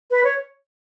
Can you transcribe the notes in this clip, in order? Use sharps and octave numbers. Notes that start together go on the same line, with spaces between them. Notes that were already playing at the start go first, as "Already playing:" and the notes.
B4
C#5